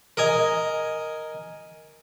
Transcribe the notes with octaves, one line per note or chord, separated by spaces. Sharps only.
A#4 D#5 G#5